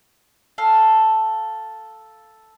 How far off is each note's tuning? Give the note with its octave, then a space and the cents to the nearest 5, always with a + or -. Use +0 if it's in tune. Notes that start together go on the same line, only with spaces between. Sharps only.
A4 +0 F5 +0